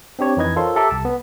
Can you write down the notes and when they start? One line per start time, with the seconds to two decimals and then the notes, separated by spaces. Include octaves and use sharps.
0.19 C4 D4 G4 C#5
0.37 F2 E3 D#4 B4 D#5 G#6
0.56 F4 A4 A#4 C5 C#5 C6
0.76 G4 A4 E5 A#5 D6
0.91 C2 A5
1.05 B3